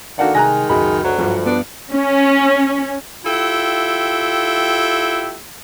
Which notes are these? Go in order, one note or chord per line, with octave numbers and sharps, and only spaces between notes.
D#3 A#3 D4 F#4 A4 F#5
C2 G#3 G#5 A#5 F#6 A#6
C#2 F#2 G#3 F#4 B5
D2 F#3
G2 F3 G3
B3 D4
C#4
E4 F4 G4 A4 E5 G5